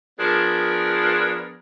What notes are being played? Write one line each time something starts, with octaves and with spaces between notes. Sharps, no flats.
F3 B3 D4 G#4 A#4